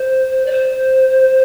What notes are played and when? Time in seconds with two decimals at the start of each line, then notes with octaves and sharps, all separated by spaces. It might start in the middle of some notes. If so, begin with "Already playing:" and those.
Already playing: C5
0.46 D5
0.52 C5